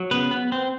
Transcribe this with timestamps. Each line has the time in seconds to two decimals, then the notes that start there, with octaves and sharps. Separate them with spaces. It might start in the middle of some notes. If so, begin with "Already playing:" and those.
Already playing: F#3
0.11 C#3 B3 B4
0.31 B3
0.52 C4